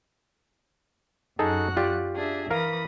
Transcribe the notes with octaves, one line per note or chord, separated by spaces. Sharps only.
F#2 D#4 F#4 G#4 A4 F#6
F4 G4 D5
D4 G#4 E5
E3 A#4 F5 B5 D#6